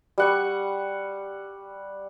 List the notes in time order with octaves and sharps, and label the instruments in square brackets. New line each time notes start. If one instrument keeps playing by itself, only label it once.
[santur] G3 F#5 C#6